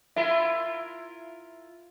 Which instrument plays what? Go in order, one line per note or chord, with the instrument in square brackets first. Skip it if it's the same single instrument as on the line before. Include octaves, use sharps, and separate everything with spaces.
[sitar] E4 F4 A#4 [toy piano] E5